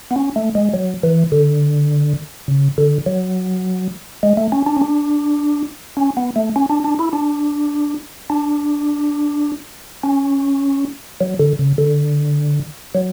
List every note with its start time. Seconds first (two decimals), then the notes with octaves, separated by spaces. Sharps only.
0.11 B3
0.16 C#4
0.36 A3
0.55 G#3
0.74 F#3
1.03 E3
1.32 D3
2.48 C#3
2.78 D3
3.06 F#3
4.23 G#3
4.37 A3
4.52 C#4
4.66 D4
4.77 C#4
4.81 D4
5.97 C#4
6.17 B3
6.36 A3
6.56 C#4
6.70 D4
6.84 D4
6.99 E4
7.13 D4
8.30 D4
10.03 C#4
11.21 F#3
11.39 D3
11.59 C#3
11.78 D3
12.95 F#3